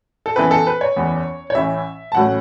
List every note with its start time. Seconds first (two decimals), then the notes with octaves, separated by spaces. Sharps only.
0.26 A4
0.36 F#1 F#2 E3 B3 E4 B4
0.51 A4
0.67 B4
0.81 C#5
0.96 F#1 E2 E3 B3
1.50 C#5
1.55 A1 A2 E3 C#4 E5
2.12 A5
2.15 A1 A2 F#3 A3 C#4 F#5